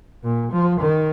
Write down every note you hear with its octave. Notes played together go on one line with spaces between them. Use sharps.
A#2
F3
D#3